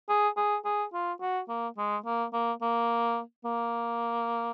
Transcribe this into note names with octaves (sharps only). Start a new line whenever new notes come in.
G#4
G#4
G#4
F4
F#4
A#3
G#3
A#3
A#3
A#3
A#3